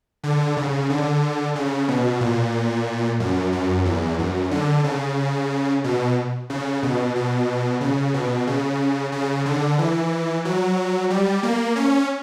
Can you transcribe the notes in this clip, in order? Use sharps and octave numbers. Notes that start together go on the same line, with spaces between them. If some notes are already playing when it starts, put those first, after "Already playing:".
D3
C#3
D3
C#3
B2
A#2
F#2
F#2
E2
F#2
D3
C#3
B2
C#3
B2
B2
C#3
B2
C#3
C#3
D3
E3
F#3
G3
A#3
C#4